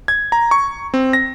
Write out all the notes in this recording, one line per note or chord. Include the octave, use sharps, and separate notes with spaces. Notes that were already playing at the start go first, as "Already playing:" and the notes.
G#6
A#5
C#6
C4
A#6